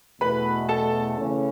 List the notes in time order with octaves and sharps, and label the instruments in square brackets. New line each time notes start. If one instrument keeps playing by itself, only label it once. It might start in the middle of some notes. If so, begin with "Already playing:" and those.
[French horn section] E2 B2 A3 [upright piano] B4 B5
[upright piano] A4 A5
[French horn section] C#3 E3 A3 C#4